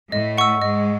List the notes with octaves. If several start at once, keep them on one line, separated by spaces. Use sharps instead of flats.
A2 A3 D#5
F#5 C#6 E6
G#2 G#3 D#5